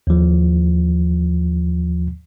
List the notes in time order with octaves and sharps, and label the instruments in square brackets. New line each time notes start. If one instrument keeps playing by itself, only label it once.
[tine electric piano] D#2 F3